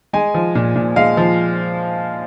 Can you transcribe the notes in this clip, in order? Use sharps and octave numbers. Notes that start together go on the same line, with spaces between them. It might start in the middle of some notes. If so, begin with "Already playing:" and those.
G#3 G#5
F3
A#2
A#2
G#3 F5
F3